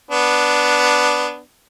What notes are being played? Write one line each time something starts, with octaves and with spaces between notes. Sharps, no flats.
B3 D4